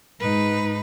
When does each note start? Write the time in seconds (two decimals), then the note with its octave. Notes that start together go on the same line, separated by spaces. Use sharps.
0.20 G#2 D#4 B4